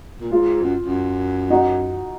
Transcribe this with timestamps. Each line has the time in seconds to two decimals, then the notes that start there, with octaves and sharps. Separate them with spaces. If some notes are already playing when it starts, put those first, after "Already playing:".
0.20 A#2
0.31 G#2 F4
0.61 F#2
0.85 F#2
1.50 D#4 F#4